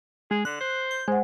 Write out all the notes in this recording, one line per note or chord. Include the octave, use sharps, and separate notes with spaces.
G#3 G#4
D3 F#6
C5
G6
G#3 C5 F#5